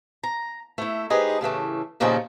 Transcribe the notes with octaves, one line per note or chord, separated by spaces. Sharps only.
A#5
A3 E4
D#4 G4 G#4 B4 C5
A2 C#3 E3 A3
D#2 A#2 C#3 F3 C#4 D#4